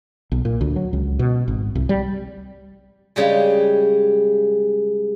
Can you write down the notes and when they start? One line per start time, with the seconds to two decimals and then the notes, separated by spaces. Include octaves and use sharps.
0.32 B1
0.45 A#2
0.61 D2
0.76 F#3
0.93 C#2
1.19 B2
1.48 G#1
1.75 C2
1.89 G3
3.16 C#3 G3 G#3